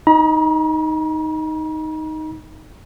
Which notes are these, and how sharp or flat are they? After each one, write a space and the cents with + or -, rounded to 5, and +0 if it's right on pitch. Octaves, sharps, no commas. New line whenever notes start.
D#4 +0 A#5 +45